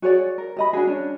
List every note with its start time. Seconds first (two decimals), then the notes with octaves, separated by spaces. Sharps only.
0.02 F#4 G#4 C#5 D5
0.38 A#4
0.57 G4 D#5 B5
0.73 D4 E4 F#4 G#4
0.87 C#4 D4